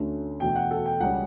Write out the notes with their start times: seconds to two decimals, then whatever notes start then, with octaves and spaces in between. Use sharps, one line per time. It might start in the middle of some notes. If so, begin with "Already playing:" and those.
Already playing: D2 D3 A3 C#4
0.40 E2 B2 A3 G5
0.56 F#5
0.71 A4
0.86 G5
1.00 C#2 C#3 G3 C#4 F#5